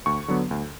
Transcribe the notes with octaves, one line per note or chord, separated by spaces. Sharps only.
D2 C#6
D3 F#3 B3
D2